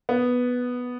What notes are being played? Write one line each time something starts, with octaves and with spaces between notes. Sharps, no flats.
B3